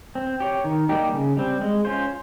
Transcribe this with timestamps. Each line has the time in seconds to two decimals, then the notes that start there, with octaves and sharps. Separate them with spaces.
0.15 C4
0.40 G4 C#5
0.64 D#3
0.89 G3 A#3 D#4 G4
1.13 C#3
1.37 G3 C4
1.61 G#3
1.85 C#4 F4 C5